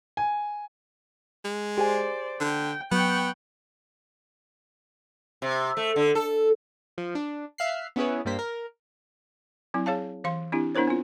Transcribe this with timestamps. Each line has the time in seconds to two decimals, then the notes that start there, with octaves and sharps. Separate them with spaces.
0.17 G#5
1.45 G#3
1.78 G4 G#4 C5 D5 G#5
2.40 D3 G5
2.92 F#3 B3 G5 C#6 F#6
5.42 C3
5.77 A3
5.96 D3
6.15 A4
6.98 F3
7.15 D4
7.58 E5 F5 F#6 C7
7.96 B3 C#4 E4 G#4 B4 C#5
8.25 G2 G3 A#3 C5 B6
8.39 A#4
9.74 F#3 C4 E4
9.86 G#4 C#5 F5 A5
10.24 E3 F5 C6
10.52 C4 D4 E4 G4
10.75 B3 D4 E4 A#4 C5 C#5
10.88 C4 F4